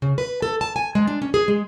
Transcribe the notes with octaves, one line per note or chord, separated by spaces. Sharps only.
C#3
B4
A4
A5
G#5
G#3
D4
C#4
G#4
G#3